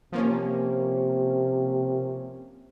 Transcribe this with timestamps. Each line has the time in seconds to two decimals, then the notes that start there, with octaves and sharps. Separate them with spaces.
0.12 C3 F3 A#3 C#4